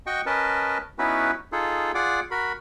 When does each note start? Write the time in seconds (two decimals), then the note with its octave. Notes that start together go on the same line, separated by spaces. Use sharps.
0.06 F#4 D#5 G5 C#6
0.26 C#4 A#4 B4 D#5 A5
0.99 B3 C#4 D#4 E4 F#4 B4
1.52 D#4 F4 G#4 A4
1.95 F4 G#4 D5 F#5 D6
2.31 F#4 A#4 B5